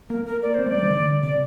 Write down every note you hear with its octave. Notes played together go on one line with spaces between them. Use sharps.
A#3 A#4
A#4
D5
C4 C5
A3 D5
G3
D#3
D3
C3 D5